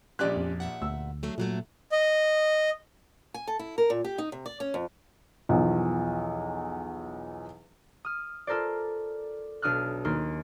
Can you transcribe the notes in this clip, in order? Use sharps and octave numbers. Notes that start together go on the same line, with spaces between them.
A#1 G#3 C#4 G4 D5 F#6
F2
A#2 E5 F#5
D2 E6
F#3 A3 D4
G2 A#2 F#3 A3
D#5
G#5
A4
E4
A#4
A#2
G4
D#4
C3
D5
C#4
F2
B1 E2 F3
D#6 F6
F4 A4 A#4 C5 D5
B1 D4 D#6 F6 F#6
D#2 A#3 C6